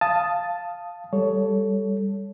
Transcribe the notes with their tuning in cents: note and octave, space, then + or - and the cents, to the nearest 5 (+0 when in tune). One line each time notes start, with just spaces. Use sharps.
F5 +0 A5 +0 D#6 +0
G3 +10 A4 +0 C#5 +15